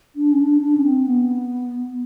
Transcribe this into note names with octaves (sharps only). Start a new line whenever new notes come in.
D4
C#4
D4
D4
C#4
C4
B3